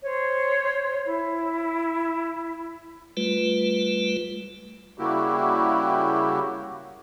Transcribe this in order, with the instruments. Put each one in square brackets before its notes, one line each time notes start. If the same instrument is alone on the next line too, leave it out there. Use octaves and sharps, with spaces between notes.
[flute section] C5 C#5
E4
[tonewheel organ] G3 A3 F4 B4
[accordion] C#3 G3 A#3 E4 F#4 G4